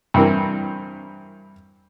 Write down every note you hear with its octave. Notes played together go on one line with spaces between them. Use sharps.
G2 E3 C4 A#4